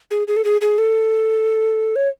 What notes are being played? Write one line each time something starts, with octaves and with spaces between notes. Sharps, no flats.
G#4
G#4
A4
G#4
G#4
A4
C#5